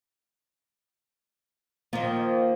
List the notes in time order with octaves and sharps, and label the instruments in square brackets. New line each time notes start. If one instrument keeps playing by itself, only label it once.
[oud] D#3 F3 [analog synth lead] A#3